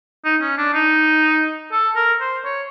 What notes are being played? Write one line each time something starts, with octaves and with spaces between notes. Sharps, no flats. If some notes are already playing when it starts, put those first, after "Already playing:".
D#4
C#4
D4
D#4
A4
A#4
C5
C#5